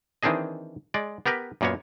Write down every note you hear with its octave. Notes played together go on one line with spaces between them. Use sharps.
D#3 E3 C4 D4 G#4 D#5
G#3 D5
B3 G4 A#4 B4
F#2 A#2 A#3 B3 C#5